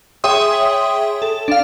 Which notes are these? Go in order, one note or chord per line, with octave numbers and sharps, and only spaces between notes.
G#4 C#5 E5 G5 C6 D#6
A4
D4 F5